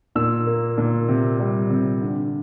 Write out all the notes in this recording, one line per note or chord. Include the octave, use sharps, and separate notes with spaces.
A#2 E6
A#3
A#2
C3
G3
C3
D3